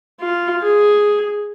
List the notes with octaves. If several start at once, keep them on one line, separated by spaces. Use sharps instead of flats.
F4
G#4